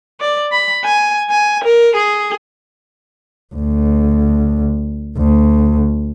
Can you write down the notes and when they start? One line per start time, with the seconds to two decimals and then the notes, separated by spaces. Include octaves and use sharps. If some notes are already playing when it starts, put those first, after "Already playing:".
0.21 D5
0.52 B5
0.85 G#5
1.30 G#5
1.64 A#4
1.96 G#4
3.55 D2
5.18 D2